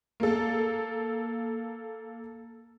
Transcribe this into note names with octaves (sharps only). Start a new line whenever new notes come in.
A#3 A4